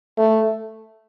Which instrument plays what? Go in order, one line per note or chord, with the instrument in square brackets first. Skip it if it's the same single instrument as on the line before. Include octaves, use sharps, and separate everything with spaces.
[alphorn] A3